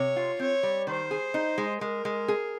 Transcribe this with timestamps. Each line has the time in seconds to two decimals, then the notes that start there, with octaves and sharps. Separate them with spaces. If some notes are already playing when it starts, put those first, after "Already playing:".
Already playing: C3 C#5
0.16 F4
0.39 C4 C#5
0.63 G3
0.87 D#3 C5
1.11 G#4
1.34 D#4
1.58 G#3
1.81 G#3 A#4
2.05 G#3
2.28 G#4